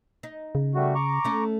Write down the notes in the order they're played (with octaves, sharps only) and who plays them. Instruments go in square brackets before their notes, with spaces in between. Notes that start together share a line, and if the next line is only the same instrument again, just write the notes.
[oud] D#4
[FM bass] C#3
[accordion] G3 A3 F#4
A#5 C#6 D6
[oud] A3 C#4